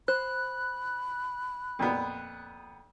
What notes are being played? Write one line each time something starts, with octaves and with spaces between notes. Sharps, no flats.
C5 B5 F#6
F2 A#2 B3